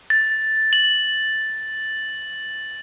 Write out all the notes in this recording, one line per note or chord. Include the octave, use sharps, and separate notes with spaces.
A6
F#7